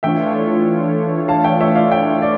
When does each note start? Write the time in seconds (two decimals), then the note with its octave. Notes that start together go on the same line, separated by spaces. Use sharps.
0.03 E3 A3 D4 F4 C#5 E5 G5
1.28 F5 A5
1.44 E5 G5
1.60 C#5 E5
1.75 D5 F5
1.92 E5 G5
2.22 D5